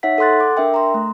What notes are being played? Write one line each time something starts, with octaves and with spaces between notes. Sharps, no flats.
D#4 C#5 E5 F#5 B6
A4 F#5 C6 F#6 A6
D6
D4 A#4 E5 G5
A#5 C6
A3